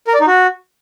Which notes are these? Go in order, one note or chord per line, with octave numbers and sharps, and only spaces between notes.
A#4
D5
D#4
F#4